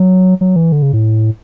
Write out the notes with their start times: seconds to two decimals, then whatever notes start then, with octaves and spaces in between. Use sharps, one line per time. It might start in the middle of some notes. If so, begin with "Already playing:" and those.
Already playing: F#3
0.41 F#3
0.56 E3
0.72 D3
0.82 C#3
0.93 A2